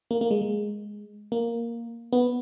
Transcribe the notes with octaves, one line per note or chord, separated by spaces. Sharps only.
A#3
A#3
G#3
G#3
A#3
B3